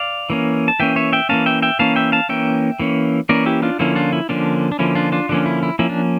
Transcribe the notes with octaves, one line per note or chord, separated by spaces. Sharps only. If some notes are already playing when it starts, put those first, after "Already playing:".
Already playing: D5 F5
E3 A#3 C#4
A5
E3 A#3 C#4 E5 G5
C#5 E5
E5 G5
E3 A#3 C#4 F5 A5
E5 G5
E5 G5
E3 A#3 C#4 F5 A5
E5 G5
F5 A5
E3 A#3 C#4 E5 G5
E3 A#3 C#4
E3 A#3 C#4 A#4 D5
E4 G4
D4 F4
D3 F3 A#3 C#4 E4
D4 F4
E4
D3 F3 A#3 C#4 D4
D4
D3 F3 A#3 C#4 E4
D4 F4
D4 F4
D3 F3 A#3 C#4 D4
E4
E4
F3 A#3 C#4 E4
D4